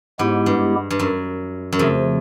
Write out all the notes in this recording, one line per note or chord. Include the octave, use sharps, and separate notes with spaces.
G#2 G#3 B3 E4 G4
G2
G2
F#2
F#2
F2 C#3 F3 A3